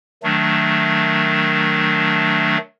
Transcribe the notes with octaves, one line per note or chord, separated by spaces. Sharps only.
D#3 F#3 A3 D4